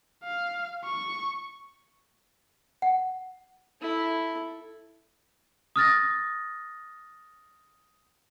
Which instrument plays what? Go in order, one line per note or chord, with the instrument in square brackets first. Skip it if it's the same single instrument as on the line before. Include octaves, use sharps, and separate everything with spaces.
[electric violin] F5
C#6
[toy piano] F#5
[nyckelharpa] E4 A4
[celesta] D#6 F6 A6 A#6